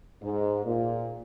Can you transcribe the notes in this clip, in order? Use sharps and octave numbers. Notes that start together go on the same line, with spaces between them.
G#2
A#2